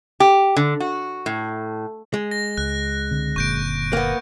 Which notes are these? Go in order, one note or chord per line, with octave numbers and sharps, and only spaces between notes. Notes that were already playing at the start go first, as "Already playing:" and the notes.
G4
D3
F#4
A2
G#3
A#6
C#2 F#6
D3 C4
F#1 A#2 C#6 G6 D7
A#3 B3